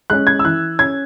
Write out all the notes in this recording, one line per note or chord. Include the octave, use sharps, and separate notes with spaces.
G#3 C#4 F#6
G#6
E6
E3 F#6
C#4 G#6